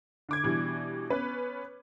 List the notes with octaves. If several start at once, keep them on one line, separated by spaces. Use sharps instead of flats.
D3 D6 G#6
B2 E3 G3 D4
B3 C#4 B4